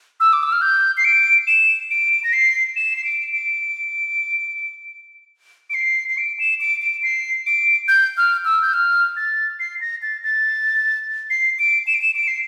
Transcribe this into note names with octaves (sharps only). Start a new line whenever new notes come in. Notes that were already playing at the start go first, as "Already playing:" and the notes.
E6
D6
E6
F6
G6
C7
D7
E7
D7
A#6
C7
E7
C7
D7
D7
D7
C7
C7
D7
E7
D7
D7
C7
D7
G6
F6
E6
G6
F6
A6
C7
A#6
A6
A6
C7
D7
E7
D7
E7
D7
C7